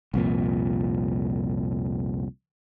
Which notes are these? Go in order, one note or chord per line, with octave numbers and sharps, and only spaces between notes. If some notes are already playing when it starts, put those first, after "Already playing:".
C2 F2 A#2